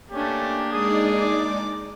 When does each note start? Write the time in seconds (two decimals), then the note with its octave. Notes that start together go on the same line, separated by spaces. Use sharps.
0.11 A3 A#3 C#4 D4 G4
0.72 G#3 D#4 G#4 D5 D#6
1.17 D6